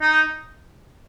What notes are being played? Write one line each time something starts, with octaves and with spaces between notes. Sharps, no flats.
D#4